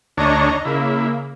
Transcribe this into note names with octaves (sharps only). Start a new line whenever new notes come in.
D2 D4 C#5 D#5 A#5
C#3 A#3 E4